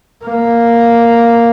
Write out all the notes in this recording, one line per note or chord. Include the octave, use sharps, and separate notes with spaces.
A#3